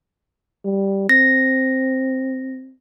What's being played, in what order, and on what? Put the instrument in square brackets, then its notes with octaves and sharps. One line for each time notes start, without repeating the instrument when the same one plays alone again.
[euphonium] G3
[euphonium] C4 [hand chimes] A#6